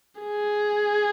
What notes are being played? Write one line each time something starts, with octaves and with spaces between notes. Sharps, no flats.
G#4